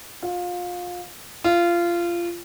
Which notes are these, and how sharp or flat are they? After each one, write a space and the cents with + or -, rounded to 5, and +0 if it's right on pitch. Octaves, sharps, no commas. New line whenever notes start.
F4 +25
F4 -20